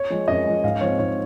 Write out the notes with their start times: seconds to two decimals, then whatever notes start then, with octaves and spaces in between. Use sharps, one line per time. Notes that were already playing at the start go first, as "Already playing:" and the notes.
Already playing: C#5
0.10 F3 G#3
0.28 F#2 D#5
0.46 F3 G#3
0.64 G#2 F5
0.81 F3 C4 C#5
0.99 G#2 C#5